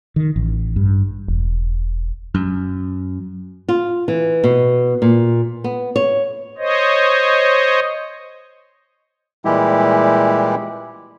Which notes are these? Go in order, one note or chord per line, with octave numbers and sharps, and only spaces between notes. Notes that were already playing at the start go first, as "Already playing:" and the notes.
D#3
A1
G2
E1
F#2
F4
E3
B2
A#2
B3
C#5
C5 C#5 D#5
A#2 E3 G3 G#3 E4 G4